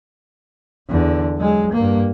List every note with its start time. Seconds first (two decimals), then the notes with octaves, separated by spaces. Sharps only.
0.88 E2 D3
1.37 F#3 G#3
1.72 G2 A#3